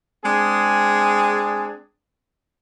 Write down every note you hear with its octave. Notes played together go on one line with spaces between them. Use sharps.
G#3 C4 D4 G#4